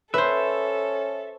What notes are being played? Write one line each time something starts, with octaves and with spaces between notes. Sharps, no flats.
C#4 A4 B4 C5 E5